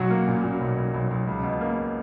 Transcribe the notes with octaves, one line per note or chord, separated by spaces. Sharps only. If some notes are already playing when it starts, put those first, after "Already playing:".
Already playing: B1 F#3 F#4
A#3
A#2
A#2
B1
B1
B1
B1
C#2
B2
A#3